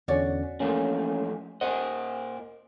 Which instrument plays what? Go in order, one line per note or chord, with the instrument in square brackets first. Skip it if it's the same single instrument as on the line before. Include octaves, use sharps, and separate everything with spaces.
[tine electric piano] E2 D3 C#4 [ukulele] F#4 C#5 D5
[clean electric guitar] E3 F3 A3 [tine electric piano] A#3 C#4
[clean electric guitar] A#2 A#4 D#5 [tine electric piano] C5 F#5